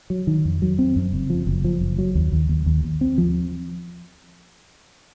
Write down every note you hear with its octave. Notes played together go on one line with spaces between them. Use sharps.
F#3
D#3
F2
F#3
C4
F#2
F#1
F3
F#1
F3
F#1
F#3
D#2
D#2
D#2
D#2
D#2
C4
F3